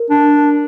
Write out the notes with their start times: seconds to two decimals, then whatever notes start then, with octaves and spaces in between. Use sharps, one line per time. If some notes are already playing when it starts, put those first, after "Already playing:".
Already playing: A#4
0.10 D4